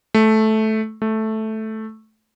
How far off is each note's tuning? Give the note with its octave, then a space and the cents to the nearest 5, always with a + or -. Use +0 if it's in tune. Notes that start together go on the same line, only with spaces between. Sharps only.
A3 -10
A3 -5